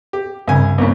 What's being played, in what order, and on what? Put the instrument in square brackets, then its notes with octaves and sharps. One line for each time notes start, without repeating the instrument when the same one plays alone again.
[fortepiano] G4
[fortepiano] C2 G#5 [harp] G2 C#3
[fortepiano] C2 A#2 C#3 [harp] A#4 B4